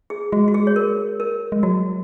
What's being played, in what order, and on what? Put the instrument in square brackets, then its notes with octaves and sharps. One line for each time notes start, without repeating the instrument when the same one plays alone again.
[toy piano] G#4
[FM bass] G#3 [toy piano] F#4
[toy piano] F#4
G#4
C#5
A#4
A#4
[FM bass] G#3
[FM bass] F#3 [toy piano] F#4